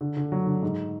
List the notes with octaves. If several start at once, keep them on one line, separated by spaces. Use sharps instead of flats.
D3
D3
F#3
D3
G#2